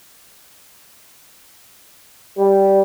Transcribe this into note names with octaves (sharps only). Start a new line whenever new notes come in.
G3